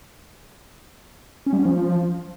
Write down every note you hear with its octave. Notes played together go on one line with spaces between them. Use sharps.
C#4
G3
C#4
F3